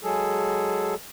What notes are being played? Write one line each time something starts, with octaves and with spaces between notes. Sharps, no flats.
F#3 G#3 G#4 A4